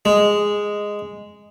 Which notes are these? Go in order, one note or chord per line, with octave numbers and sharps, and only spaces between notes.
G#3